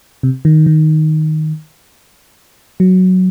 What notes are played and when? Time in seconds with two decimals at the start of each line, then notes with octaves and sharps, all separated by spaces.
0.23 C3
0.45 D#3
0.66 D#3
2.80 F#3